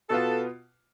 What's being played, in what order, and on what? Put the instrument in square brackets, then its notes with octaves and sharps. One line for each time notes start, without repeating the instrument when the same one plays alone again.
[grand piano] B2 B3 F4 [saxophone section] A4